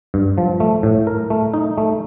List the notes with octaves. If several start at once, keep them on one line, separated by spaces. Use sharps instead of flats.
G2
F3
A3
A2
A#4
A3
D#4
A3